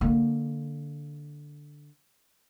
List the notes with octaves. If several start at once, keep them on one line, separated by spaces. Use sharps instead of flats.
D3 A#3